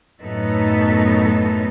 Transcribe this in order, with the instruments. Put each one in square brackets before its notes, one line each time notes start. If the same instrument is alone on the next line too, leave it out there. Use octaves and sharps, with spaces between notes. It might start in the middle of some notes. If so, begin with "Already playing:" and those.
[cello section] F#2 A2 F#3 B3 D#4 A4